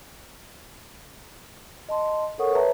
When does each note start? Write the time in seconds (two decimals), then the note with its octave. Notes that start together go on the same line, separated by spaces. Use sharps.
1.89 D#5 A5 C6
2.38 A4 A#4 C#5 F#5 C#6 D#6
2.52 B4 C#5 E5 A5 A#5